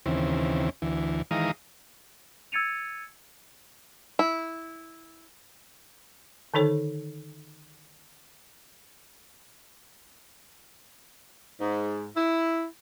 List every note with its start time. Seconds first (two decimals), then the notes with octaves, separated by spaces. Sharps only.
0.06 D#2 C#3 E3 C4
0.82 D2 E3
1.31 D#3 E3 G#3 F5 A#5 D#6
2.52 E6 G#6 A6 C#7 D#7 F7
4.19 E4
6.54 D3 D#3 D#4 A4 C#5
11.61 G#2
12.16 E4